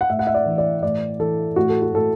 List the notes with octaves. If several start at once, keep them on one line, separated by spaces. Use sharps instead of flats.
F#5
A2 E5
F#5
E5
D5
E3
D5
A2 D5
E3 A4
A2 F#4
A4
F#4
A2 A4